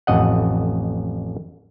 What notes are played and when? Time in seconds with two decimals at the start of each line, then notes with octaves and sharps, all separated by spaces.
0.07 A1 F2 D#5 F#5